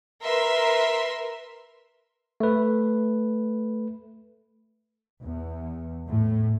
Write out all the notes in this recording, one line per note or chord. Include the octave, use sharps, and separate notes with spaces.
A#4 B4 E5 C6
A3 B4
E2
A2